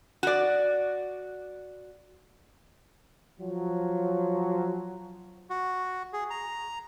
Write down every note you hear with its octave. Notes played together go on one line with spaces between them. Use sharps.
F#4 D5
F3 F#3
F#4
G#4
A#5